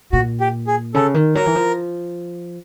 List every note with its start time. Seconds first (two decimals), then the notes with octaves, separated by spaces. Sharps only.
0.13 A#2 F#4
0.40 G4
0.67 G#4
0.94 C#3 A4
1.14 D#3
1.35 F#3 A#4
1.46 E3
1.55 F3